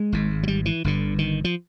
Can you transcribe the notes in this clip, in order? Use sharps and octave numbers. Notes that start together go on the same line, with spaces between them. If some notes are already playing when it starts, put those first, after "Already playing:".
Already playing: G#3
G#1 G#2
F#3
G3
E3
G1 G2 D3
D#3
F3